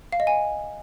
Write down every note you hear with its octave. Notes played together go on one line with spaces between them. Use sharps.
F5
D#5
G#5